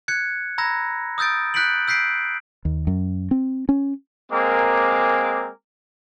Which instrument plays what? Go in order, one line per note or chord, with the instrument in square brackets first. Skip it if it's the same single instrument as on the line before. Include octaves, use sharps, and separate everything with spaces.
[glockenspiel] F#6 G#6 C#7
A#5 B5 E6 G#6 A#6
D#6 E6 G6 A6 D7
F#6 G6 B6 C#7 D7 F#7
E6 G6 B6 C7 D7
[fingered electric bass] D#2
F#2
C4
C#4
[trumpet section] G#3 A#3 C4 A#4 G#5 D6